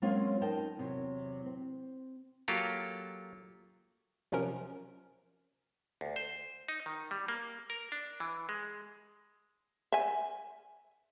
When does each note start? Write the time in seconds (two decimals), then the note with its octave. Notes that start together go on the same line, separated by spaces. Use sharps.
0.02 F#3 G#3 A#3 C4 C#4 F4
0.41 D#4 A#4 G5 A5
0.77 E2 C3 F#3
1.46 C4
2.48 F#3 A#3 F4 G4 A4
4.32 C3 F3 F#3 C#4 A#4
6.01 D2
6.16 C5
6.68 D#4
6.86 D#3
7.11 G3
7.28 A#3
7.70 A#4
7.92 D4
8.20 E3
8.49 G#3
9.92 E5 G#5